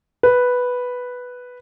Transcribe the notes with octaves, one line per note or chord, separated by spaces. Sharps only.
B4